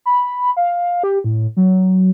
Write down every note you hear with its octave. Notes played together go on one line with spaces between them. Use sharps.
B5
F5
G4
A2
F#3